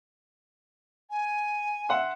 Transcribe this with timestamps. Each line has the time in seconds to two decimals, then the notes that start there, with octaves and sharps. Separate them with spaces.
1.10 G#5
1.89 E5 F#5 C6